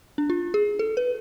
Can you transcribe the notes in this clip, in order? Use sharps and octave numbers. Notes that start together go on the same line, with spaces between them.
D4
F4
G#4
A4
B4